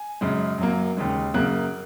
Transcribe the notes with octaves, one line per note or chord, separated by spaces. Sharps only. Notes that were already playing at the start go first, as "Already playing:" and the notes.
Already playing: G#5
F#2 C#3 G#3
F#2 F#3 A#3
D#2 C#3 G#3
F#2 C#3 F#3 A#3 F#6